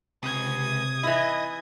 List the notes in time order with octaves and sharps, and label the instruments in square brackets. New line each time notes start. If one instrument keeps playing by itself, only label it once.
[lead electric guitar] C#2 [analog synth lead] C3 [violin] D#6 G#6
[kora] E3 E4 [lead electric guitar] D#5